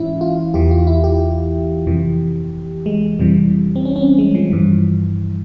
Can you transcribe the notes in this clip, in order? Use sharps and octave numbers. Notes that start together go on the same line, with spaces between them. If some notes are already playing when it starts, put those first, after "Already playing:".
Already playing: G#2 E3 C#4 E4
F4
E2 E3 G4
F4
E4
G4
F2 C3 E3
G#3
F2 C3 E3 G3
C4
C#4
C#4
C4
G#3
F3
G2 E3